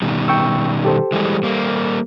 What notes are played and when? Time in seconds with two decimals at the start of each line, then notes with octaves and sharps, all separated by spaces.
0.02 B2 D#3 G3
0.28 G5 C#6 E6
0.85 G4 A4 C5
1.12 E3 G3 G#3
1.43 G3 A#3